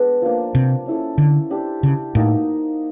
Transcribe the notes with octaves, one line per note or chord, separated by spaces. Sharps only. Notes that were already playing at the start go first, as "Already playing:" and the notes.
Already playing: G#3 B3 D4
F3 A#3 D4
C3
C#4 E4 A4
D3
D4 G4 C5
C#3
A2 A#3 D#4 F#4